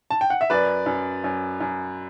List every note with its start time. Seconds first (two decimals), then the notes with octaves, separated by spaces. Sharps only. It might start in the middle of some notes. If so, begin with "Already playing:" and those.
0.11 A5
0.21 G5
0.30 F#5
0.41 E5
0.50 F#2 B4 D5
0.86 F#2
1.24 F#2
1.60 F#2